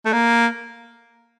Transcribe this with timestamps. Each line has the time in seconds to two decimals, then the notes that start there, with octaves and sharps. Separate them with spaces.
0.06 A3
0.13 A#3